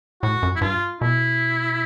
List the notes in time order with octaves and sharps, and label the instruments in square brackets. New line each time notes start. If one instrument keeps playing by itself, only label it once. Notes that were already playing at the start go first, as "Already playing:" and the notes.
[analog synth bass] A2 [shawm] F#4
[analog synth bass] F#2
[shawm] E4
[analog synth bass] G2 [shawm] F4
[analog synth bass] B2 [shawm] E4